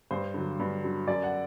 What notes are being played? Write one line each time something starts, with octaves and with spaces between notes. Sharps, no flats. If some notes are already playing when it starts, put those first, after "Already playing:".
G2 C5
D3 F#3
G2
D3 F#3
F#2 D5
F#5